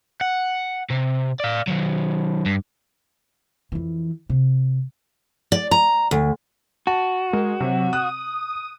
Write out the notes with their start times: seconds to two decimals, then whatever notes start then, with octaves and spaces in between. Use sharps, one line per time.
0.21 F#5
0.90 C3
1.40 D5 F5
1.68 D#3 F#3
2.45 G2
3.72 F2 E3
4.29 C3
5.52 D5
5.71 A#5
6.11 D2
6.87 F#4 A5
7.33 G#3 A#4
7.60 C3 F#3
7.93 D#6 F#6